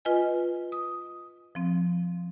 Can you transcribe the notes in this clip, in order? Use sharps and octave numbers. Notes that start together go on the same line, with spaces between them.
F4 B4 D#5 G#5
D#6
F3 C4